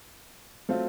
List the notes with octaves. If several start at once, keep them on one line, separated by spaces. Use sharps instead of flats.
F#3 A3 C4 F4